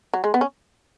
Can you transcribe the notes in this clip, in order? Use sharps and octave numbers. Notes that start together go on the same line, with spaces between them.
F#3
G#3
B3
C#4